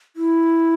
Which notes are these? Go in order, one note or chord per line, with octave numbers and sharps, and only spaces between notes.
E4